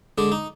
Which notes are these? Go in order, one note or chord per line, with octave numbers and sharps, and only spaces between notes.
D3 G#3 D4
D#4